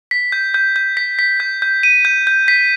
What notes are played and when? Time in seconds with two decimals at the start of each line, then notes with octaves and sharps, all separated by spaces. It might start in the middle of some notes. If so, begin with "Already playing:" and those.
0.11 B6
0.32 G6
0.54 G6
0.76 G6
0.97 B6
1.19 B6
1.40 G6
1.62 G6
1.83 D#7
2.05 G6
2.27 G6
2.48 B6